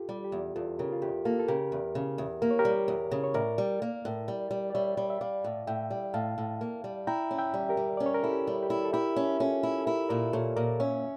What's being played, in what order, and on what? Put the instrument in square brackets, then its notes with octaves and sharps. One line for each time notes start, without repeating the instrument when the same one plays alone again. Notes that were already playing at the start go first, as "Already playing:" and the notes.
Already playing: [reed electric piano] F4 G4 A4
[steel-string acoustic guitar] G3
[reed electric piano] G4
[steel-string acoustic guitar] E2
[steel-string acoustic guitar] E2 [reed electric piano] F4 A4
[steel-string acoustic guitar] C#3 [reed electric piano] G4 A#4
[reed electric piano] F4
[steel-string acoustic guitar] E2 [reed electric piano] G4
[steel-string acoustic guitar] A#3 [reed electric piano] F4 A4
[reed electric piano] A4
[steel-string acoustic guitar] C#3 [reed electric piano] G4 A#4
[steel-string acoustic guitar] E2
C#3
E2
[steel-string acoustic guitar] A#3 [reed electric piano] A#4
[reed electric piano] C#5
G4 A#4
[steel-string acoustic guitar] G3
E2
C#3
[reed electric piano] C#5
[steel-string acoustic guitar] A2 [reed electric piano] A#4 D5
[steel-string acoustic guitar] G3
A#3
A2
G3
G3
[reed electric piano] D5
[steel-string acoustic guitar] G3 [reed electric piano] C#5 E5
[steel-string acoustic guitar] G3
[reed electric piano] E5
[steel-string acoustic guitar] G3 [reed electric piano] D5 F5
[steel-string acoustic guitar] A2
[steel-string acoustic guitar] A2 [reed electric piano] E5 G5
[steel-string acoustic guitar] G3
[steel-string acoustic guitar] A2 [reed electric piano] F5 A5
[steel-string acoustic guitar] A2
A#3
G3
[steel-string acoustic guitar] E4 [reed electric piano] G5 A#5
[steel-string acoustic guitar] C#4
[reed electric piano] E5 G5
[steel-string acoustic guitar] G3
[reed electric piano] G4 A#4
[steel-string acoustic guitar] G3
[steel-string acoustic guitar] C#4 [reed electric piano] D5
[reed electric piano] C#5
A#4
[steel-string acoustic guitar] E4 [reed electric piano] A4
[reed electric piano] G4
[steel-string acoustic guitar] G3
[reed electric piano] G4
[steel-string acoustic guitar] E4
[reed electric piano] A4
[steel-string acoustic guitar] E4 [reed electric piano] G4 A#4
[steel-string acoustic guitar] C#4
[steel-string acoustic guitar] C#4 [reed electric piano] F4 A4
[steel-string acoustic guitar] E4
[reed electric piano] A4
[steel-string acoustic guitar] E4 [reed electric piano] G4 A#4
[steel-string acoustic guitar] A#2 [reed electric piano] A#4 D5
[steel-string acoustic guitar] A#2 [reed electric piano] A4 C#5
[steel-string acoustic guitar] A#2 [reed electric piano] A#4 D5
[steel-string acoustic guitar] C#4 [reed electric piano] C#5 E5